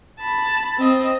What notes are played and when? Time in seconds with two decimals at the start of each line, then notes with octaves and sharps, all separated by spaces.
0.20 A5 B5
0.78 C4 D#5